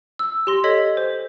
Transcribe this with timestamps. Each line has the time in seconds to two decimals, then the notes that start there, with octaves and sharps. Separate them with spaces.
0.19 E6
0.47 G4 C6 A#6
0.64 A4 C#5 D#5 G#6 B6
0.97 C5